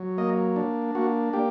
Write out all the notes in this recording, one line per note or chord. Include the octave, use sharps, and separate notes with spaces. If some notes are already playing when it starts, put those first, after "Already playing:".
Already playing: F#3
A#3 D#5
D4
A#3 F#4
A#3 G4